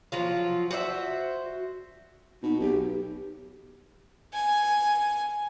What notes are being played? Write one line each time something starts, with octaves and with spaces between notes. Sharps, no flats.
F3 F#3 F4
F#4 C5 C#5 E5
B2 D#4
B1 G4
G#5